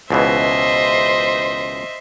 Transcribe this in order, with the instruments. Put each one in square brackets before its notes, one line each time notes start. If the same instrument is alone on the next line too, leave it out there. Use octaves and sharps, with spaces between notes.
[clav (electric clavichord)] C#2 B2 E3 [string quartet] C5 C6 [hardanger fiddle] D#5 E5